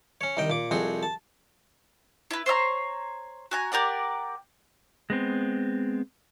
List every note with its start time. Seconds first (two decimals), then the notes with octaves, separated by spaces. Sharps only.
0.21 C#4 C#5
0.37 C2 D#3 D#5 G5
0.50 A#2 D6
0.71 C2 F2 C4 F#4 G#4 D#6
1.03 A5
2.31 E4 B4
2.46 C5 C#5 E5 A#5
3.51 F#4 G#5 A#5
3.72 G4 A#4 D5 F#5
5.10 G#3 B3 C4